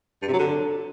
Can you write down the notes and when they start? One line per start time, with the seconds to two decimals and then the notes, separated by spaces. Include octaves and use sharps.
0.22 G2
0.28 C3
0.33 F#3
0.39 D3